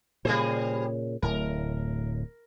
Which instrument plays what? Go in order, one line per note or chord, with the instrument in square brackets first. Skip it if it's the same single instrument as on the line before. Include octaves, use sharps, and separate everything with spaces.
[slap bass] A#2 C#3 [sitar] G3 G#4 C5
[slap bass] D1 A2 [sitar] A#4